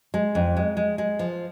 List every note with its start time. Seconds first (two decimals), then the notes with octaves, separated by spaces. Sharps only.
0.14 G#3
0.35 F2
0.57 G#3
0.77 G#3
0.98 G#3
1.19 F3